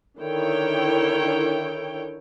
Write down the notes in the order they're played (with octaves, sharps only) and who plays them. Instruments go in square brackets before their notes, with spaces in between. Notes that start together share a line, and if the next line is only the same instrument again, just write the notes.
[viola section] D3 D#3 E4 C#5 G5